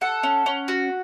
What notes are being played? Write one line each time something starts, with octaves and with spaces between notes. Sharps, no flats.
A4 F#5
C#4
C#4
F#4